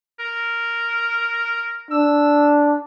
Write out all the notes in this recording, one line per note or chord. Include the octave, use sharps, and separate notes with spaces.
A#4
D4 E6